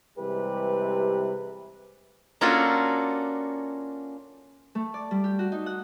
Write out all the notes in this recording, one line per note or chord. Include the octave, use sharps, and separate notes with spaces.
C3 E3 G3 G#3 G4 B4
A#3 C#4 D4 F4 F#4 A4
A3
D5
G3
G4
F#4
D#4
F#5